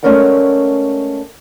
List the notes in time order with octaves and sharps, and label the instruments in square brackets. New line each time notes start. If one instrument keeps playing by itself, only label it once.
[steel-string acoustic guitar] G#3 A3 C#4 A#4 D5 F#5